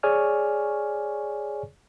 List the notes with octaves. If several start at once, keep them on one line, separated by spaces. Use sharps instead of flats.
G#4 C#5 D5 G#5 C#6 F6